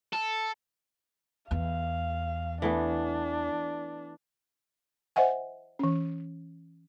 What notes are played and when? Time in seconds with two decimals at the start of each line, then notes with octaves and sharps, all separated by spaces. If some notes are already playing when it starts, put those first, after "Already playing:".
0.13 A4
1.51 E2 F5
2.62 E3 A3 B3 D4
5.16 C5 D#5 E5 F#5 G#5
5.79 E3 C#4